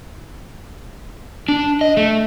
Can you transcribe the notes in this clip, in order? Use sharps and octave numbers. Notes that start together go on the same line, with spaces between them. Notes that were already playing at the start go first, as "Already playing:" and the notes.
D4
D#5
A3